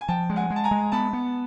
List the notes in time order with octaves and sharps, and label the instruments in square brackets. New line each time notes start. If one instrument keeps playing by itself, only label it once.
[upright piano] G#5
[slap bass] F3 [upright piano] G5 A5
[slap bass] G#3
[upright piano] F#5 G#5
[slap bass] G#3
[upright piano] A5
G#5 A#5
[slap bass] G#3
[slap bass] B3 [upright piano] A5 B5
[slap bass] B3